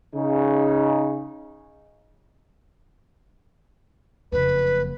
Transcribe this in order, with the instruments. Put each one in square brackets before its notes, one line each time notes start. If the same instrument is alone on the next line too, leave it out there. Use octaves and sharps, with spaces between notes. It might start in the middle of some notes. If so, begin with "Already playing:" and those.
[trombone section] C#3 D#4
[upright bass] F#1 F2 [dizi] B4